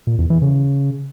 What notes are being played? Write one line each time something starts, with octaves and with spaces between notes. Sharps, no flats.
A#2
E2
E3
C#3